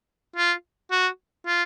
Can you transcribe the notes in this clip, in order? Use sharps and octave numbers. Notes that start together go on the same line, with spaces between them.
F4
F#4
F4